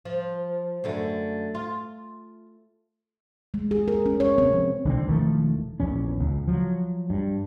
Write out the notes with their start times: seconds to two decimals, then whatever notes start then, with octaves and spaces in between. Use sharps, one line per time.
0.05 F3
0.84 F#2 D3 A3
1.55 F4
3.54 G#3
3.71 G#4
3.88 A#4
4.06 C#4
4.20 C#5
4.38 C4
4.53 F3
4.85 B1 D3 E3 C4
5.06 E1 D#3 F3 A3
5.80 A#1 E2 C#4
6.20 C#2
6.47 F3 F#3
7.10 G2